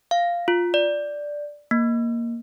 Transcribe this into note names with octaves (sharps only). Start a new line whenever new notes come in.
F5
F4
D5
A#3